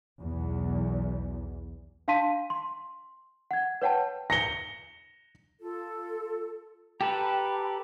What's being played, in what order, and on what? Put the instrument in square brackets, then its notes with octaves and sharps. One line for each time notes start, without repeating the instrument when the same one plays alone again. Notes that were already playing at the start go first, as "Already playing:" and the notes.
[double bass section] B1 E2
[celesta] D4 F5 A5 C6 B6 D#7
C6
F#5 G#6
B4 C#5 F#5 G5 A5
[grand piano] A#6 C#7 G7
[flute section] F4 A4
[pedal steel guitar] G4 A4 B4 [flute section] G5 A#5 B5